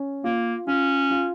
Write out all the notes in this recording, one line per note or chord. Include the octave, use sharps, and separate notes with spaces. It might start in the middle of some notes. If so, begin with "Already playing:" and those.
Already playing: C#4
A#3 F4
C#4 F4
F4